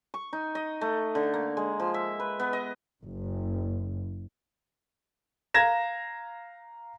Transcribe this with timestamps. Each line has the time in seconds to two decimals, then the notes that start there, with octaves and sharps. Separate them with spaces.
0.14 C#6
0.33 D#4
0.55 D#5
0.81 A3
1.15 D3
1.34 A#3
1.57 G#3
1.80 F3
1.94 E5
2.20 B4
2.40 B3
2.53 D#5
3.01 F#1
5.54 F5 A#5 G#6 A#6 E7